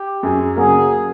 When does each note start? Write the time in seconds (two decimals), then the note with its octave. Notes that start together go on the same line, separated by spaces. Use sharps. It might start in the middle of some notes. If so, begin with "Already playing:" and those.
Already playing: G4
0.23 F#2 G#4
0.56 C#3 F#3 A#3 G#4